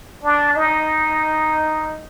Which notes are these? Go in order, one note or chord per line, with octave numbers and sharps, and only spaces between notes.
D4
D#4